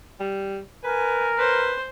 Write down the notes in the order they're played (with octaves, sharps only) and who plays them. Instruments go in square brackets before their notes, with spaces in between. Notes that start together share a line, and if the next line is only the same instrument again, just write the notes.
[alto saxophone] G3
[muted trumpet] A#4 [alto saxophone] B4 [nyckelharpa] G#5
[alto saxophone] B4 [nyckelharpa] C5